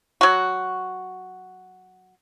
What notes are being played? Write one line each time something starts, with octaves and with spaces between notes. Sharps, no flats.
F#3 F#4